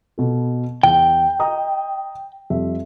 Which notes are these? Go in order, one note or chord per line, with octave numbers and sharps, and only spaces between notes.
B2 A4
E2 G5
D#5 A#5 D#6
F2 G3 E5